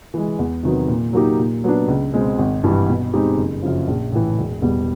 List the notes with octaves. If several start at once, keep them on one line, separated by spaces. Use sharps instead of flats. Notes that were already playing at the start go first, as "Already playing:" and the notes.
E3 G#3
E2
C3 D#3 F#3 B3
A#2
F#3 A#3 D#4 G4
A#2
F#3 B3 D4
C#2
B2 G#3 C4
G#1
G2 E3 G3
B2
G#3 C4 D#4 G4
F#1
F#2 C#3 F3
A#1
A2 E3
E1
E2 B2 G3